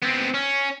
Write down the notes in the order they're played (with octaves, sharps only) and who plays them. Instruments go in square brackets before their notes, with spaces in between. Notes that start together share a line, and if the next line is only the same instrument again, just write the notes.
[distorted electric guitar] B3 C4
C#4